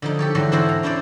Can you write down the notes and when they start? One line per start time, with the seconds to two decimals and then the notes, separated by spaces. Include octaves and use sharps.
0.02 D3 F3 D#4
0.19 G4 A4 C#5
0.35 E2 G#2 D3 F#3 F#4
0.52 C4 D4 E4 F#4 A4 C5
0.69 A#5
0.83 C#4 D4 E4 C5 D5